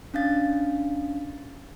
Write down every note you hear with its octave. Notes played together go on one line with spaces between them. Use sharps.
C#4 D4 F5 A6